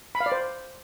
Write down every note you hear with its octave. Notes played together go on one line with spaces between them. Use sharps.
B5
F5
D5
C5